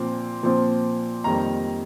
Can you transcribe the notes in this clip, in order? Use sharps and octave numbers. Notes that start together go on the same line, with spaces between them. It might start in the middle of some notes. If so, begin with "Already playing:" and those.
Already playing: A#2 F3 C4
A#2 F3 C4
F2 D#3 G3 A#3 A#5